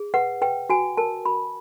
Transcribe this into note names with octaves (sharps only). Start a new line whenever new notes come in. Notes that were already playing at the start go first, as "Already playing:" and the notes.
Already playing: G#4
B4 F#5
B4 G5
F#4 G#5
A#4 A5
F#4 B5